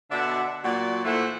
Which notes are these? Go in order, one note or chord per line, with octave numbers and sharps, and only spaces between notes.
B2 D3 D5 E5 F#5
A#2 F#3 F#4 D5
A#2 E3 A3 C5 E5 F#5